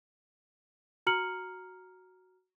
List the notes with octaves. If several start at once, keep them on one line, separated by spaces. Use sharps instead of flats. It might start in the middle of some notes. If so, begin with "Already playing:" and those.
F#4 A#5 F6 C#7 F#7